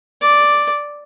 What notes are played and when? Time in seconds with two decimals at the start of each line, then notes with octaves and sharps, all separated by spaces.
0.21 D5